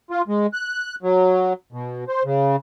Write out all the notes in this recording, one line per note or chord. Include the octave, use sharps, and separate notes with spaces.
F4
G#3
F#6
F#3
B2
C5
C#3